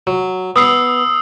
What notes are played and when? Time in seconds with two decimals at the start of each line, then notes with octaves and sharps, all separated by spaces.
0.07 F#3
0.56 B3 D#6 E6 C7